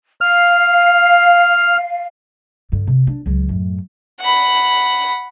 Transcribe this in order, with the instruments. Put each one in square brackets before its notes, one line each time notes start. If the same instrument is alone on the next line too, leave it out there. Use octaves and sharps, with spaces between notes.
[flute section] F5 [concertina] F6
[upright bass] G2 D3
C3
D4
C#2 F#3
F#2 A2
[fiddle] F#5 B5